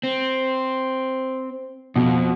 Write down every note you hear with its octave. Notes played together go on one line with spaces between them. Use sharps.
C4
F2 B2